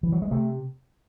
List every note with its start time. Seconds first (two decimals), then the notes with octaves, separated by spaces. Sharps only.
0.03 E3
0.12 F#3
0.22 G#3
0.31 C3 A3